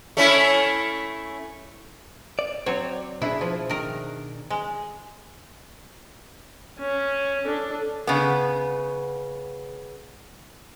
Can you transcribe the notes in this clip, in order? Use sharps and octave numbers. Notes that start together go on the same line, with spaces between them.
A3 C#4 E4
D5
F#3 C4 C#5
B2 D4 E4 G#4
F3
D#3 A#4
G#3
C#4
D4 A4
C#3 B3